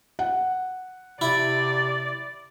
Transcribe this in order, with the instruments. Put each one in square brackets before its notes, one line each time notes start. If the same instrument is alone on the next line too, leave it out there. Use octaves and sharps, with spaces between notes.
[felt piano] F#5
[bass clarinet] C3 [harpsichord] E4 [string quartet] D5